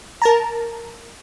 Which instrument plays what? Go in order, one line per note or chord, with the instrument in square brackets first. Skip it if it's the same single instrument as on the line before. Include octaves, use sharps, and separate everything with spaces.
[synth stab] A#4 A5 A#5